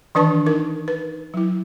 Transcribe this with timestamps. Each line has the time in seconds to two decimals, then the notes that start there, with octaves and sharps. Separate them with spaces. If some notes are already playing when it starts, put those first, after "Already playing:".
0.15 D#3 E3 D4 B4 A5 C#6
0.46 D#4 A#4
0.88 B4
1.34 F#3 E4